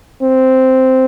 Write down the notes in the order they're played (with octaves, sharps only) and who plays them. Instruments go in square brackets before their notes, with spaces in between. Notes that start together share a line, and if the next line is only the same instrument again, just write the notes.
[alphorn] C4